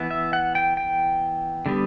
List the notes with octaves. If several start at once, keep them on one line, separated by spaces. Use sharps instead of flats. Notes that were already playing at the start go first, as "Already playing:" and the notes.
Already playing: E3 B3
E5
F#5
G5
G5
D3 G3 B3